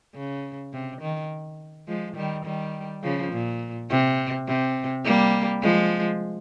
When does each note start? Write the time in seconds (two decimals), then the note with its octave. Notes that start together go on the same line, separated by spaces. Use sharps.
0.15 C#3
0.73 C3
1.02 D#3
1.88 F3 G#3
2.16 D#3 G3
2.45 D#3 G3
3.03 C#3 F3
3.32 A#2
3.90 C3
4.47 C3
5.05 G3 A#3
5.62 F3 G#3